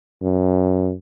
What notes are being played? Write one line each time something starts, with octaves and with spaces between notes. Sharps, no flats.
F#2